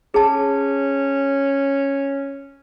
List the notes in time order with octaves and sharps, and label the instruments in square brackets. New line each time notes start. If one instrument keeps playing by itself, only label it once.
[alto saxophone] C#4 [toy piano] G#4 A5